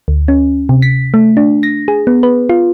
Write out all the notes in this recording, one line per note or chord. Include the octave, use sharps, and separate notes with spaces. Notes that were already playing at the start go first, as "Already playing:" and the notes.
D2
C#4
C3
B6
A3
D4
A#6
G#4
B3
B4
F4